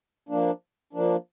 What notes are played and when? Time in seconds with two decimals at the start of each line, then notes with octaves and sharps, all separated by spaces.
0.29 F3 A#3 D4
0.93 F3 A#3 D4